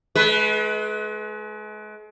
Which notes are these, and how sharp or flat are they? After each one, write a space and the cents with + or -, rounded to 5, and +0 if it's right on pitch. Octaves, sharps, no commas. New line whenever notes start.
G#3 +40 B4 +0